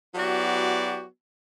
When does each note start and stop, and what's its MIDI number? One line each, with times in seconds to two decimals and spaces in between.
0.15 1.05 54
0.15 1.05 59
0.15 1.05 64
0.15 1.05 66
0.15 1.05 67
0.15 1.05 74